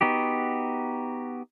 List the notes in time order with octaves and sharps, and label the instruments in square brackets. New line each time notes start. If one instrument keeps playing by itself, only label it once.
[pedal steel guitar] B3 D#4 F#4 G4